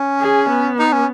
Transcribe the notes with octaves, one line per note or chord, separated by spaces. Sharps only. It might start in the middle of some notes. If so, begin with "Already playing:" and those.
Already playing: C#4
G#4
B3
D#4
C#4